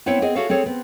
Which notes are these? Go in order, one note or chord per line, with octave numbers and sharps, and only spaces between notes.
B3 C4 E4 C#5 F#5 G5
B3 C4 G#4 D#5
F#4 G#4 A4 C#5 E5 F5
C4 G#4 A4 C#5
B3 C4